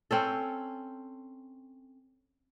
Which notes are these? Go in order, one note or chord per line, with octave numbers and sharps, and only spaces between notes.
C4 C#4 A4